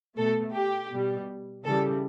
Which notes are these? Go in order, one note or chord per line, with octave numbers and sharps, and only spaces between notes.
B2 A3 A4
G4
B2 G3
C#3 E3 G3 A4